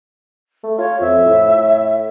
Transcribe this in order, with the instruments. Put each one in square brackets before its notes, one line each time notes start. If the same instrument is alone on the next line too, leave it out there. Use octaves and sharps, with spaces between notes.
[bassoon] A3
[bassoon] F4 [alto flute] C#5
[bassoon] F2 [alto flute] E5
[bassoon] A2